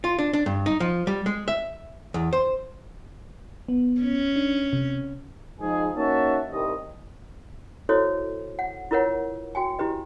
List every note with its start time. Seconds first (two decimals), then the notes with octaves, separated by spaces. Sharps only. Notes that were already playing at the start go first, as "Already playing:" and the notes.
0.04 F4
0.19 D4
0.33 D4
0.46 G2
0.66 D#4
0.80 F3
1.07 G3
1.26 G#3
1.48 E5
2.14 E2
2.33 C5
3.68 B3
4.01 C#4
4.36 D4
4.73 C3
5.60 F3 G#3 D#4 G#4
5.95 A#3 C#4 D#4 F#4 E5 A5
6.50 C2 G2 D#3 D#5
7.89 E4 F#4 A4 C5 C#5 D#5
8.59 F#5
8.91 E4 F4 A#4 B4 C#5 F#5
9.55 F#4 G5 G#5
9.79 E4 G4 B4 D#5